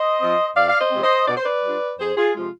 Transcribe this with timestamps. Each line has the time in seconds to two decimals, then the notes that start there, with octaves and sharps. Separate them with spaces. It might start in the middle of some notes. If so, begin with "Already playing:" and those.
Already playing: C5 D#5
0.21 F3 C4 F4
0.56 F2 D5 F5
0.69 F5
0.80 C5 D#5
0.92 C3 F3 G#3 C4
1.04 C5 D#5
1.28 B2 D5
1.37 C5
1.45 B4 D5
1.63 G3 D4 F4
1.99 F2 G#4 C5
2.17 F4 G#4
2.35 C3 F3 G#3 F4